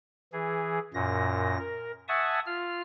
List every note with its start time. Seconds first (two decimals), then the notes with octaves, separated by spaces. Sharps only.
0.33 E3 G#4
0.94 F#2 A#2 A#6
1.59 A#4
2.08 E5 F#5 G#5 A5 C#6 D#6
2.46 F4 F6